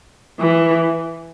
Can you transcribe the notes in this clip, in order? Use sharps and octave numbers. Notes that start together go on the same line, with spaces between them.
E3